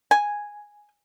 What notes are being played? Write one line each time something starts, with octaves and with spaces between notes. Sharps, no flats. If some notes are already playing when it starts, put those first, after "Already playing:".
G#5